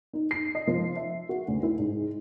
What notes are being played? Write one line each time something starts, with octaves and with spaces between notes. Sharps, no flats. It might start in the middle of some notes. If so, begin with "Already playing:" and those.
D#4
C7
D#5
F3
E5
F#4
D2
E4
G#2